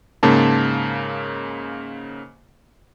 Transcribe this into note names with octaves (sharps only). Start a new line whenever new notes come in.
G#2 C#3 A#3 A5